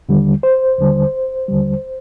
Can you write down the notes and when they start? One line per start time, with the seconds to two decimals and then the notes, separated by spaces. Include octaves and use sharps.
0.09 D#2 D3 G3
0.43 C5
0.78 D#2 D3 G3
1.48 D#2 D3 G3